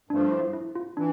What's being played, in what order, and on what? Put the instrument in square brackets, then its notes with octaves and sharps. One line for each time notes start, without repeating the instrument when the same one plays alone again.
[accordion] G2 F3 A3 [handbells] D4
[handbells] E4
E4
F4
[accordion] E3 [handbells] D4